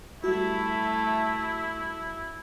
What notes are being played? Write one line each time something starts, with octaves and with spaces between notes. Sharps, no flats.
G3 A3 E4 F#4